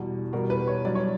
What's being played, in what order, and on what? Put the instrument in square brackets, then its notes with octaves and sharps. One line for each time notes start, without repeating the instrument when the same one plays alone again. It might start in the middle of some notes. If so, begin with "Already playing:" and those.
Already playing: [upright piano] E2 B2 G3
E2 B2 G3 A#4
B4
C#5
G2 F#3 D5
C#5